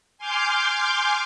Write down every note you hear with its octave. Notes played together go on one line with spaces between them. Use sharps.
G#5 C6 D6 F6 G6